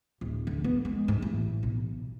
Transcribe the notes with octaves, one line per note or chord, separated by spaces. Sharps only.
D1
D3
B3
G#3
G#2
A1
B1